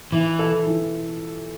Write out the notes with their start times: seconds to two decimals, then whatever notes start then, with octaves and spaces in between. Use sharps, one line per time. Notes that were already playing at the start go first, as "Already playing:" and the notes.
0.12 E3 E4
0.39 A4
0.67 E3